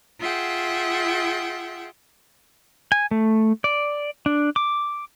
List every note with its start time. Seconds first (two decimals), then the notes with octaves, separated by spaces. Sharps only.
0.19 F4 G#4 E5 F#5 G5
2.92 G#5
3.11 A3
3.64 D5
4.26 D4
4.56 D6